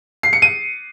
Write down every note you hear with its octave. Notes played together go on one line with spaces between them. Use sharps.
C7
C#7
D#7